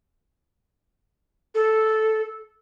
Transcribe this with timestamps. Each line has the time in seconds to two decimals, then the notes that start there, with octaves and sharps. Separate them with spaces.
1.55 A4